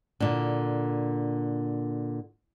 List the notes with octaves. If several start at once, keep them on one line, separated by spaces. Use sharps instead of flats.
A#2 D3